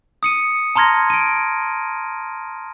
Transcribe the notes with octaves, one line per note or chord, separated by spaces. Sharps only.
D#6 C#7 D#7
A5 A#5 C6 F6 G#6 A#6
D7 D#7